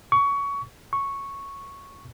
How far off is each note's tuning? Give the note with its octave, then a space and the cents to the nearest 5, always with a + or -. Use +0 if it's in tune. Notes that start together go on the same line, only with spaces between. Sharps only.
C#6 +20
C#6 -5